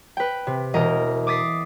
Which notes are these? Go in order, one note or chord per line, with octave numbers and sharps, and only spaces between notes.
B4 G5
C3
E1 B2 A#4 D#5
D6 D#6 A6 B6 C7